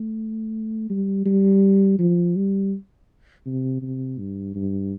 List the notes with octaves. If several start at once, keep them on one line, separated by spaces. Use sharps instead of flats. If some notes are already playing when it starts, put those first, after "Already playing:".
Already playing: A3
G3
G3
F3
G3
C3
C3
G2
G2